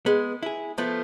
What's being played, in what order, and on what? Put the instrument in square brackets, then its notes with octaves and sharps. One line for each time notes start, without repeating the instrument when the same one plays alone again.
[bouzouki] G#3 [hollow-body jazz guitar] B3
[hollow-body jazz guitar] E4 G#4
[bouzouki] F3 A3 [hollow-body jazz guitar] B3